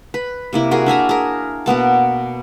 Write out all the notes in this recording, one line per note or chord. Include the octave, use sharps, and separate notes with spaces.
B4
C3 A#3 E4
F#4 G#4 A#4
D4 E5 G#5 A#5
G#4 A#4
B2 A#3 B3 A5